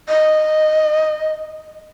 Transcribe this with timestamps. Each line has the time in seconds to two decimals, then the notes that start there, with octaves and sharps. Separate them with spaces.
0.08 D#5